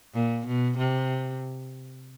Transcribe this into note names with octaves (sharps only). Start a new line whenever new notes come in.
A#2
B2
C3